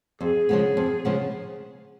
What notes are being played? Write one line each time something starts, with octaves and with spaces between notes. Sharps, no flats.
F2 G#4
C#3 F3 G#3 B3
F2
C#3 F3 G#3 B3